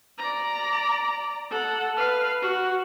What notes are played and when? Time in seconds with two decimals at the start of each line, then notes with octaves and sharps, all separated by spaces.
0.18 D5 A#5
1.51 A4 F#5
1.97 B4 F5
2.42 F#4